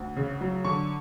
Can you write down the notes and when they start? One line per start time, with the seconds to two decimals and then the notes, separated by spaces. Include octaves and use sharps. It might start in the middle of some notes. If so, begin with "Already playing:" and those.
Already playing: D2
0.16 C#3
0.41 F#3
0.65 D3 C#6